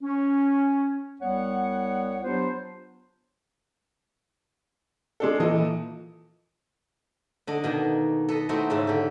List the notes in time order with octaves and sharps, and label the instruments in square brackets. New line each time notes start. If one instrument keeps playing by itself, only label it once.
[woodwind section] C#4
C2 G3 B3 C#5 F#5
F#3 B3 D4 F4 G4 C5
[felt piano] G#3 D4 A4
[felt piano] A#2 A4 D#5 [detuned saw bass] E3
[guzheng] D3 D4 D#5
B2 D#3 A#3
A4 B4 D#5
A3 C4 D#4 E4 F#4 A4
G#2 C#3 E5
D3 G4